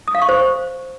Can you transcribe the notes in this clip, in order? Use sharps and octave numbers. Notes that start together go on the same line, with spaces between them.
D#6
F5
C#6
C5